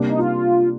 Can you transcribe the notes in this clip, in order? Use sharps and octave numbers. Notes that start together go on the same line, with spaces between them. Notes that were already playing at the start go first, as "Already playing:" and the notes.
Already playing: C3 G3 A#3 D4
D#4
F4